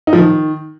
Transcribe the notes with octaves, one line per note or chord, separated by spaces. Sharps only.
D#4
F3
D#3